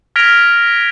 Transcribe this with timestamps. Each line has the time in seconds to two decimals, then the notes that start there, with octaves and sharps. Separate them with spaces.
0.16 F6 G#6 A#6 B6 D7 F7